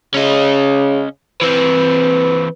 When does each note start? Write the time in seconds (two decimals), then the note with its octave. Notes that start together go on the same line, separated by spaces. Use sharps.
0.15 C#3 C#4 D#5
1.42 E3 C4 B4